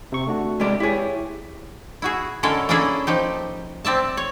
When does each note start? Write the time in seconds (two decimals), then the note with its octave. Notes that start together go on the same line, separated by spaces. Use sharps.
0.12 C3 C#6
0.27 A3 D4 F#4
0.60 C3 G#3 D5
0.80 E4 G4 G#4 C#5
2.02 E4 F#4 G#4
2.43 D3 G#3 C#4 E4 A4 A#4
2.69 A#3 C#4 D4 E4 G#4 A4
3.07 F3 D#4 G4
3.85 C4 D5 E5 A5
4.17 C#5